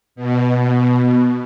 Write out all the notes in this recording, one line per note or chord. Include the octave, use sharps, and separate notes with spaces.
B2